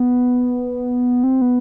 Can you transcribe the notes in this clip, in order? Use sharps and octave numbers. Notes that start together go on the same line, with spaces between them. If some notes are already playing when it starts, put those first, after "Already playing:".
Already playing: B3
C4
B3